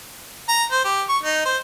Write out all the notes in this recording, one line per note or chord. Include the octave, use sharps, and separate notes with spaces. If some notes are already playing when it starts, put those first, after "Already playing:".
A#5
C5
G4
C#6
D#4
C5